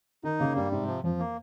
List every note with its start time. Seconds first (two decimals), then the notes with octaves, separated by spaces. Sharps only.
0.23 D#3 D#4
0.40 C#3 A#3
0.55 G2 G3
0.72 G#2 C3
0.87 F3
1.03 F2 F3
1.19 A#3